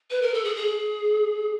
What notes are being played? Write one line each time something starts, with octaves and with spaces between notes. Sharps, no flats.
B4
A#4
A4
G#4
G#4